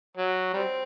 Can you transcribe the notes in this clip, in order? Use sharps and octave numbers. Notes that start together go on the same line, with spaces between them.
F#3
G3 C4